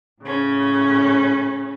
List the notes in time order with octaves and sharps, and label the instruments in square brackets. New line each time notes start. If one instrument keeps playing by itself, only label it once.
[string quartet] A2 C#3 C#4